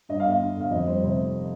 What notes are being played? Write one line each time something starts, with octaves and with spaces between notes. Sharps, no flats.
G2 D#5
F5
G1
F5
D3
G1 F5
F2 D#5
G3 C5
C3 C5
F1